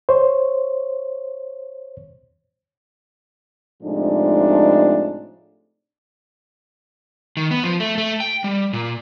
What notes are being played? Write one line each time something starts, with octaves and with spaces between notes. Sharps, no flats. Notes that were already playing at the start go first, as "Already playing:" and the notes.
C5 C#5
A2 C3 F3 G#3 D4 D#4
D#3
B3
F3
A3
A3
G5
G3
A#2